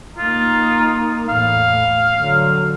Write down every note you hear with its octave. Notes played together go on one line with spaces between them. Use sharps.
A#3 D#4 F4
E2 A2 F5
D3 F#3